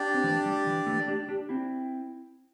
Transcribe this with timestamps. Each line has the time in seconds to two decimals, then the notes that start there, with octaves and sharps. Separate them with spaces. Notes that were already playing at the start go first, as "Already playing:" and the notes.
Already playing: D4 G4 D5
0.14 C4
0.24 E3 A3
0.46 G3
0.67 E3
0.86 E3 A3
1.08 D4 G4
1.29 D4 G4
1.49 C4 E4